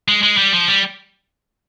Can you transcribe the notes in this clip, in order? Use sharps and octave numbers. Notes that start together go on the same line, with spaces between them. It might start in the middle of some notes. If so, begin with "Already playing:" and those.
G#3
G#3
G3
F3
G3